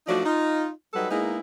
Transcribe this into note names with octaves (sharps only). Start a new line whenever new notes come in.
F3 A3 D4 D#4 F#4 D5
D#4 F4
F#3 G3 D#4 A4 B4
G#3 A#3 B3 D#4 E4 G#4